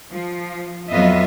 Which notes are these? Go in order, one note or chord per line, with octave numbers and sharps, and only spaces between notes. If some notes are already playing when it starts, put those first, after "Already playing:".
F3
F2 F#3 B3 F4 D#5 E5